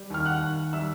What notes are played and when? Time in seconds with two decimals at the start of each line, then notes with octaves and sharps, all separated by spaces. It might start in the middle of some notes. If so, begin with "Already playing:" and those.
Already playing: G3
0.10 D#2 F6
0.25 F#5 F#6
0.42 D#2
0.73 G3 E5 E6